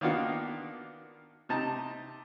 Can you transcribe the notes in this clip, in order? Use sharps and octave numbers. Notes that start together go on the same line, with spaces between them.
D#3 A#3 B3 D4 F4 F#4
C3 D#4 A5 A#5